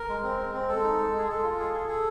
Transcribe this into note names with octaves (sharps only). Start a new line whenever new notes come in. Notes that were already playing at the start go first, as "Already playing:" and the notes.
Already playing: A#4
G#3
C4
G#3
C4
G#3 A4
D#4
G#3
G#3 G#4
G#3 A4
F4
G#4
G#4
G#4